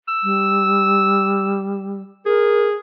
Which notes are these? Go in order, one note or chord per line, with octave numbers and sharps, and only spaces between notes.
E6
G3
G#4 A#4